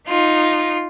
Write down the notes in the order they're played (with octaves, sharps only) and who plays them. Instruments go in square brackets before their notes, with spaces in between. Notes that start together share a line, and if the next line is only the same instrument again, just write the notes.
[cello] D#4 [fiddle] F4